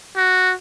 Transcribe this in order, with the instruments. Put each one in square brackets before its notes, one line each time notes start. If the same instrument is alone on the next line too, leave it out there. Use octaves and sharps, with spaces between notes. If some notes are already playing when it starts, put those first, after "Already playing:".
[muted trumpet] F#4